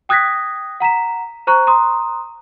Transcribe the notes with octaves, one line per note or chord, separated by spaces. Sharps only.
G5 D#6 F#6 G#6 A#6 B6
F#5 A#5 B6 E7
C5 A#5 C#6 F#6
A#5 C6 D#6